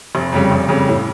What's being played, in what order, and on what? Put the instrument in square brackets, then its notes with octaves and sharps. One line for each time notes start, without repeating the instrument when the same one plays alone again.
[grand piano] F1
F2 C#3 G3
F1
F2 C#3 G3
A2